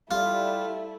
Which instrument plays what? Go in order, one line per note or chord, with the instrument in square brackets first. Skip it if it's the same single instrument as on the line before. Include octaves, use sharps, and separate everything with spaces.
[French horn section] G3 [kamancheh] A3 E4 [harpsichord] F4